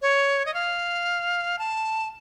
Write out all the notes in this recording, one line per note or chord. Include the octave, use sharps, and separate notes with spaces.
C#5
D#5
F5
A5